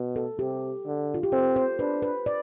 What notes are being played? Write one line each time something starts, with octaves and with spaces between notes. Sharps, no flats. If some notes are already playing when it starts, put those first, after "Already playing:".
Already playing: B2
A4
C3 G4
D3
F4
G4
C4 A4
C5
D4 B4
B4
D5